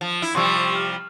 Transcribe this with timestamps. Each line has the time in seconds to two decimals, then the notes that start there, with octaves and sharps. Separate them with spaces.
0.01 F3
0.22 E4
0.35 C3 F3 G3 C6 C#6 E6
0.75 F6